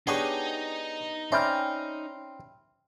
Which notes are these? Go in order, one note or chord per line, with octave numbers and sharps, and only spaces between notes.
B3 D4 D#4 G4 G#4 C#5 D#5 G#5
C4 C#4 D5 E5 G5 B5 F6